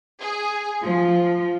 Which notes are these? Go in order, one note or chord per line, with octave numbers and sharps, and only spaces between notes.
G#4
F3